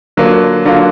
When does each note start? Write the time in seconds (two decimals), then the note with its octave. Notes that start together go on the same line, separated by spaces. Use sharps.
0.17 D3 F#3 A#3 F4
0.65 D3 F#3 A#3 F4